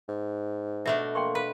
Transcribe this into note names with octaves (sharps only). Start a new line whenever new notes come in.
G#2
B2 A3 D4 E5
A#3 G5 C6 C#6
B4 F5